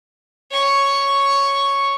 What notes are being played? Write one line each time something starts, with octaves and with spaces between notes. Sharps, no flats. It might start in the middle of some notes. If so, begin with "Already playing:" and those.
C#5 C#6